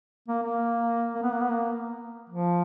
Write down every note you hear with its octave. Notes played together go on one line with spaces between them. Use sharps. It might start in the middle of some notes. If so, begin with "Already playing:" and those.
A#3
A#3
A#3
B3
A#3
B3
A#3
F3